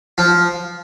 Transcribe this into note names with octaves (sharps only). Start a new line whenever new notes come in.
F3